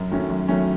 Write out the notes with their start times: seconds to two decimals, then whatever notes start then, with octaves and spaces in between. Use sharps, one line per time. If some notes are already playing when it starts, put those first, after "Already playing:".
Already playing: F#2
0.11 D#3 F#3 A3 C#4
0.30 F#2
0.48 D#3 F#3 A3 C#4